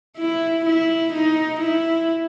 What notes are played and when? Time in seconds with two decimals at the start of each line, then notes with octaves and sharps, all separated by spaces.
0.17 E4
0.65 E4
1.13 D#4
1.60 E4